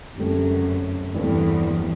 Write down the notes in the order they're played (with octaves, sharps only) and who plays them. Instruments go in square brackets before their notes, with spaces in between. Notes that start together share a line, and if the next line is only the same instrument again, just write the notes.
[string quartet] F#2 [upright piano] D3 A3 C4 G4
[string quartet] E2 [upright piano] G2 E3 A3 C4